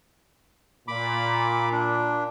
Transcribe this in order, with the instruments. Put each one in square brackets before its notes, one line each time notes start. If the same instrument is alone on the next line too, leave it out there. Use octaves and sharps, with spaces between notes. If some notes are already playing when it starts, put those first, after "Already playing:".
[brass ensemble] A#2 [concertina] B5 D6
[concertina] D4